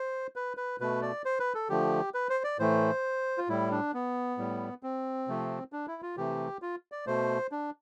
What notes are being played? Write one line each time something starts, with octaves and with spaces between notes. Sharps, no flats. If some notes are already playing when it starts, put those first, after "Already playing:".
Already playing: C5
B4
B4
B2 A3 B4
D5
C5
B4
A4
D3 F3 A3 G4
B4
C5
D5
A2 E3 A3 C5
F4
A2 G3 E4
D4
B3
A2 G3
C4
C3 F3 A3
D4
E4
F4
C3 E3 A3 G4
F4
D5
B2 A3 C5
D4